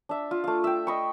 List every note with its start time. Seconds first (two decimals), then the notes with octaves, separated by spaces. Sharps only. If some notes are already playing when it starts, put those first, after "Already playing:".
0.09 D4 E5
0.31 F4
0.44 A3 F5
0.64 E5 G5
0.87 D#5 B5 C#6